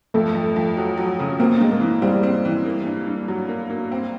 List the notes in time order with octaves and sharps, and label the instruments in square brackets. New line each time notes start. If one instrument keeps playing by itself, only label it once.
[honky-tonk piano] F2 [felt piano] A3
[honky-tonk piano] F2
F2
F#3
F#3
C#3
[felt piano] A#3 [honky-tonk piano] C4
[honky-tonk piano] G#3
[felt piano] A#3
[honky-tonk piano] E3
[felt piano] G3 [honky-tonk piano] C4
[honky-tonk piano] C4
E3
A#3
G2
G2
F#3
A#3
A#3
C4